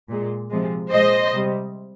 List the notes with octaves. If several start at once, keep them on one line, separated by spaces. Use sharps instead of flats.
A#2 G#3
C3 F3 G#3
A#2 F3 G#3 C5 D#5
C3 G3